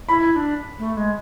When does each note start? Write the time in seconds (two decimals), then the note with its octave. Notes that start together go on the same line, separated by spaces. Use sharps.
0.09 E4 B5
0.32 E4
0.36 D4
0.79 A3
0.97 G#3